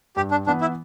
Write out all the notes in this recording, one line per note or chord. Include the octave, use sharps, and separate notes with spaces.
G2 G4
D4
E3 B3 D4
E4